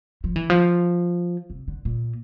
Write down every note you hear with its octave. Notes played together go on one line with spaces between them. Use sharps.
F3
E3
F3
C3
D3
A#2